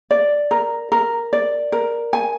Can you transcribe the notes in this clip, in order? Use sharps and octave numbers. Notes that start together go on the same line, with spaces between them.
D5
A#4
A#4
D5
A#4
G#5